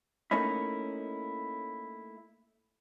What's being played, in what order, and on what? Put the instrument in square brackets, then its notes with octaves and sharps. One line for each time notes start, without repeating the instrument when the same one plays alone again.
[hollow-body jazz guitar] A3 A#3 C#4 D#4 E4